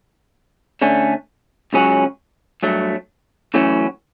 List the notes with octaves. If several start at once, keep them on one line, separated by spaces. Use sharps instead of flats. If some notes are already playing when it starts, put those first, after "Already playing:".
D3 A3 C#4
C#2 C#3 F#3 C#4 F#4
G2 F#3 A3
F#2 E3 A3 C#4 F#4